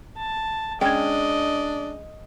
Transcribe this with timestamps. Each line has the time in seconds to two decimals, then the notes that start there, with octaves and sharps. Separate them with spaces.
0.17 A5
0.81 G#3 C#4 D4 D#5 G5 G#6